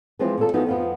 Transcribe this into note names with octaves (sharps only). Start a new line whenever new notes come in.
E3 F3 G#3 C4 E4 F4
A#2 A4
E3 F3 B3 D#4 F#4
F2 F3 B3